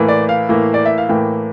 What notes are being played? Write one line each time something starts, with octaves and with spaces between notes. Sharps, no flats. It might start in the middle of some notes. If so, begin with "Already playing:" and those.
Already playing: A2 E3 A#3
D5
F5
A2 E3 A#3
D5
E5
F5
A2 E3 A#3 G5